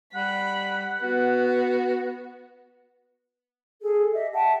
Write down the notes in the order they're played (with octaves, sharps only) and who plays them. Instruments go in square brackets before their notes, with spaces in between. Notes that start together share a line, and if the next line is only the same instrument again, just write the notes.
[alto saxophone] G3 [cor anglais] F#5 [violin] B5
[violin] B3 [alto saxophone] F#4
[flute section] G#4 A4
G4 D#5 E5
E5 F#5 G5 A5